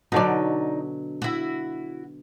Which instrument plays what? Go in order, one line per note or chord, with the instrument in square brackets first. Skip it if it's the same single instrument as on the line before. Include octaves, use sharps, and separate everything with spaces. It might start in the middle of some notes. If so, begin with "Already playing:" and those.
[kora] B2 D3 F#3 [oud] D#4 D5
[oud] E4 F#4